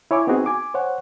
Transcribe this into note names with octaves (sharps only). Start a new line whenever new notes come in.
E4 C#5 G#5 D6
B3 C4 D#4 F#4 G#4
G#5 D6
C5 C#5 F#5